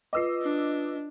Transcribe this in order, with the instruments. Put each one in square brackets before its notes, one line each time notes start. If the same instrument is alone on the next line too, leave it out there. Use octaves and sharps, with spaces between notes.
[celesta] F4 B4 D6 [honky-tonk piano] D#5 E6 C7
[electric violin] D4